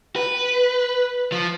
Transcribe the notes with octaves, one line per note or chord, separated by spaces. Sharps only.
B4
F3